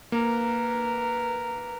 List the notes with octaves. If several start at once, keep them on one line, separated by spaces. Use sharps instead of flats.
A#3 A#4 B4